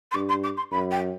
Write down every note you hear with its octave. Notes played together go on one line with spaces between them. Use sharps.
C6
G2 D6
C6
D6
C6
F#2 B5
G5